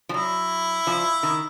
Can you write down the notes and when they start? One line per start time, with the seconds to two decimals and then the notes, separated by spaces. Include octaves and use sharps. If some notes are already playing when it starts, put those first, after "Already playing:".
0.09 F3
0.14 F#3 E4
0.87 F3
1.23 D#3